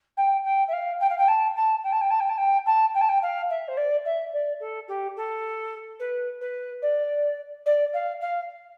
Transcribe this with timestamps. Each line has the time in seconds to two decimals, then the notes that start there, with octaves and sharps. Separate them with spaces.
0.17 G5
0.44 G5
0.68 E5
0.73 F5
1.00 G5
1.09 F5
1.18 G5
1.28 A5
1.56 A5
1.83 G5
1.92 A5
2.01 G5
2.10 A5
2.20 G5
2.29 A5
2.37 G5
2.66 A5
2.94 G5
3.01 A5
3.09 G5
3.22 F5
3.50 E5
3.68 C5
3.77 D5
4.05 E5
4.33 D5
4.60 A4
4.88 G4
5.16 A4
5.99 B4
6.41 B4
6.82 D5
7.66 D5
7.93 F5
8.21 F5